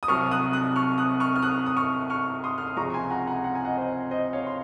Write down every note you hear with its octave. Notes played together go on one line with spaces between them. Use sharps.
D#6
C2 C3 F#3 C#6 F6
D#6 F#6
D#6 F#6
C#6 F6
D#6 F#6
C#6 F6
F6
D#6 F#6
D#6
C#6 F6
C#6 F6
C6 D#6
F6
D#6
C#2 C3 F3 G#3 A#5 C#6
G#5 C6
F#5 A#5
F#5 A#5
F#5
G#5
D#5 F#5
C5 D#5
C5 D#5
C#5 F5
C6